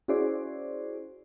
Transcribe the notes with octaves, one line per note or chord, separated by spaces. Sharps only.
C#4 E4 F#4 G#4 C5 D5